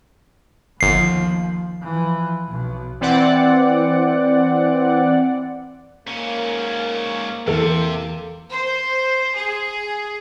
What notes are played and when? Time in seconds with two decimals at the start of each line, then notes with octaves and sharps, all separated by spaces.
0.81 G1 D#2 F3 C7
1.82 E3 F3
2.48 B1 B2
3.01 E3 C4 D5 F#5
6.07 G#2 A#3 C#4
7.48 E2 C3 E3 A4
8.51 C5
9.35 G#4